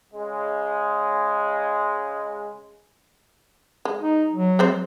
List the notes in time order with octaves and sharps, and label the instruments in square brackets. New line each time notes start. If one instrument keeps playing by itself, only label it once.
[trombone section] C#3 G#3
[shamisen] G#3
[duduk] D#4
F#3
[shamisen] G#3 C4 C5